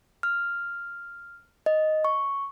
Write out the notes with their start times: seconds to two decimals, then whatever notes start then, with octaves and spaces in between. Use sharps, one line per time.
0.23 F6
1.66 D#5
2.05 C#6